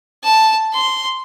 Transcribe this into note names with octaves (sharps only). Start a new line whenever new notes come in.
A5
C6